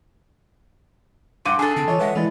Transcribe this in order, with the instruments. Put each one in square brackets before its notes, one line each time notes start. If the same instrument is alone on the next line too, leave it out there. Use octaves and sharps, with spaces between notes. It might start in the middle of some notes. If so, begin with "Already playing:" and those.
[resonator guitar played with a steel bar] G2 [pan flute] F#5 [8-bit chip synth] C6 [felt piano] D6 D#7
[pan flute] D4 [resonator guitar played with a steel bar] G#4 A4 [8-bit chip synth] A5
[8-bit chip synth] D3 [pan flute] C4
[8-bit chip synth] E3 [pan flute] F4 [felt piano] C#5
[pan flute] G#3 [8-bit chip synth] B4 E5 F#5
[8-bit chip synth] E3 [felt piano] G#3 E4 [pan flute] D5